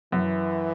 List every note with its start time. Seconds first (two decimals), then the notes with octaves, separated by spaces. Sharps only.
0.12 F#2 E3